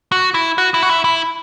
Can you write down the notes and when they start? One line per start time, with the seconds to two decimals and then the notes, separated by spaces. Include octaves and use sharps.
0.12 F#4
0.34 E4
0.58 F#4
0.74 E4
0.83 F#4
0.90 E4
1.04 E4